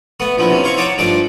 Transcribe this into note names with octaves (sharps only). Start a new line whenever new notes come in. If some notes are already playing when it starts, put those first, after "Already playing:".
A3 B3 F#5
A#1 F3 B3 E4
C3 C#4
E4 C5 F5 C#6
D#4 C#5 F#5 A5 D6
G2 F3 A3 D4 D5 D6